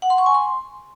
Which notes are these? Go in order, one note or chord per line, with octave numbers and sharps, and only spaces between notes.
F#5
C6
C#6
G#5
C6